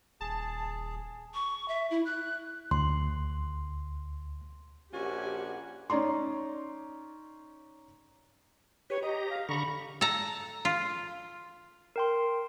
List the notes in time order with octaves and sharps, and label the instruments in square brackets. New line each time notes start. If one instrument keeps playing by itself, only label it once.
[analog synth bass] D#1 [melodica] G#4 [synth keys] A5
[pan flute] C#6
E5
E4
F#6
[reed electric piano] D2 [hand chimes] C6
[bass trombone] A#1 [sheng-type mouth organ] C#4 G#5 [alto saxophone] F#4 [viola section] G4
[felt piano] C#4 D#4 D5 A#5 C6
[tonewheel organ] G4 B4 [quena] C#5
[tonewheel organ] G4 A#5 [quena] D#5
[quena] F5
[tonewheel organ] D3 A#5 C#6 [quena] B5
[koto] A4 A#5
F4
[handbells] A#4 G5 C6